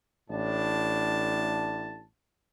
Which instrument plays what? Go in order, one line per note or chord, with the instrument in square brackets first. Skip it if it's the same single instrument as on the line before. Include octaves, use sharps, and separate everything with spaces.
[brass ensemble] A1 A2 D4 A5